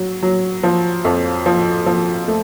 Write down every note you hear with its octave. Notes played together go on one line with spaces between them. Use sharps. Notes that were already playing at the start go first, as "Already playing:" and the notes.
Already playing: F#3
F#3
F3
F2
F3
F3
A3